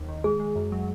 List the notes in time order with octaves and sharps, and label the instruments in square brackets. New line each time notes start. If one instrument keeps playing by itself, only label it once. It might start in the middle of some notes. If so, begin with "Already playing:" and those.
Already playing: [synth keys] D#2
D#3
[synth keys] G#3 [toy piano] G#4
[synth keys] G#3
F#2
F#3